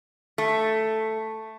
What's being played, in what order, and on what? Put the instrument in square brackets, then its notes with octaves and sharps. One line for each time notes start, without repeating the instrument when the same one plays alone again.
[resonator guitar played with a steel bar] A3